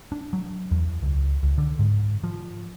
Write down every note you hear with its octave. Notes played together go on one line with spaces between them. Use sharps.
D4
F#3
E2
C#2
C#2
D3
G#2
F3